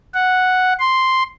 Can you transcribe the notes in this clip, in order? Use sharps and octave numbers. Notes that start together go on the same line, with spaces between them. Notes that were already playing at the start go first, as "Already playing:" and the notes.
F#5
C6